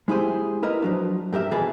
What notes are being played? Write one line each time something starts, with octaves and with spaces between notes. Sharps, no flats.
G#3 E4 G4 G#4 C5
E4 A#4 B4 D#5
F3 F#3 D4
G2 G4 A#4 E5
B2 E3 G#4 A5 B5